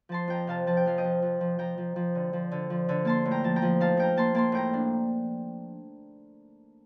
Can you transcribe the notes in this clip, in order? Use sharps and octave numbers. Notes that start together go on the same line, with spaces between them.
F3 A5 C6
F2 G5 A#5
C3 F5 A5
F3 A5
G5
F2 F5
D#5 G5
F2
F2
F3
F3 G5 A#5
F3
F3
D3
F3
D3
F3
D3
A#3 A5 C6
A2
G5 A#5
F3 A5
G5 A#5
F3
D#4 F5 A5
D#4 G5 A#5
A#3 A5 C6
A#3 A5 C6
A2 G5 A#5
D4